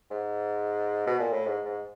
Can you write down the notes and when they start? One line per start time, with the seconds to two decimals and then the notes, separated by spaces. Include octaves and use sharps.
0.11 G#2
1.07 B2
1.20 A#2
1.33 A2
1.46 G#2
1.65 G#2